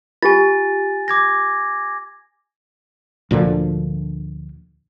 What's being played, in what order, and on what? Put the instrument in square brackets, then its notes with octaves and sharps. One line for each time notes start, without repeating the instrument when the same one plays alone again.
[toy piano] F4 G4 [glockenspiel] G#5 A6
[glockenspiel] D6 G#6 A#6
[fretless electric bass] D2 A#2 D3 F3